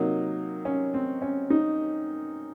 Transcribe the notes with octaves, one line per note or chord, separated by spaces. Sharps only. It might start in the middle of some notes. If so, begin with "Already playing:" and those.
Already playing: C3 F#3 A#3 D#4
C#4
C4
C#4
D#4